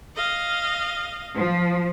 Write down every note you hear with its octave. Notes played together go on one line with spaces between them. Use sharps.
D#5 F5
F3